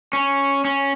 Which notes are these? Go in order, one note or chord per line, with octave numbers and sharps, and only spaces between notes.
C#4
C#4